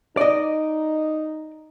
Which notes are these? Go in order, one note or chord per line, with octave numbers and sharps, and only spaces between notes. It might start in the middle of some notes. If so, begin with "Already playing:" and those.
D#4 D5 D#5